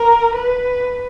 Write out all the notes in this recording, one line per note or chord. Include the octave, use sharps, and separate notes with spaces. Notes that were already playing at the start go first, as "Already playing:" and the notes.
Already playing: A#4
B4